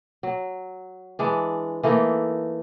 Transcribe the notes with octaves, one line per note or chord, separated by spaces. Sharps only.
F#3
E3 G#3 D4
E3 A3 A#3 D#4